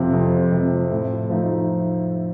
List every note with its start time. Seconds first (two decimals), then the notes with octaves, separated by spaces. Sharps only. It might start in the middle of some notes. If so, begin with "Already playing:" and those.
Already playing: F2 C3 F3
0.13 F2
0.52 C3 F3
0.91 A2
1.29 F3 A3 D#4